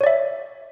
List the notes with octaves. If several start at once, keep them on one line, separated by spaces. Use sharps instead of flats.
C#5 D5 E5